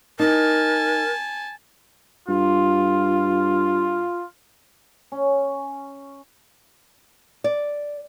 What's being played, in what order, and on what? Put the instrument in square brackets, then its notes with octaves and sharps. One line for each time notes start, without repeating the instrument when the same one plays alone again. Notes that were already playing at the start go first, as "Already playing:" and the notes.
[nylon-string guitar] D#4 [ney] A#4 [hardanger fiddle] G#5 A5
[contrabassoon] G2 [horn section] F4
[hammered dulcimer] C#4
[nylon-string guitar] D5